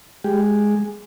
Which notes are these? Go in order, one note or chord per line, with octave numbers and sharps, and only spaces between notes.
G#3 G4